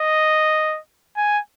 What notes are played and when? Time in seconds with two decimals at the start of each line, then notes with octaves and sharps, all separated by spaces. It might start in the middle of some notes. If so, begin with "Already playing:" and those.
Already playing: D#5
1.17 G#5